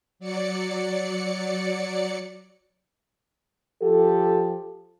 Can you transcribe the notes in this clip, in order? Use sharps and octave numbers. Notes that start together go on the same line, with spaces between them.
F#3 D5 C#7
F3 G4 A4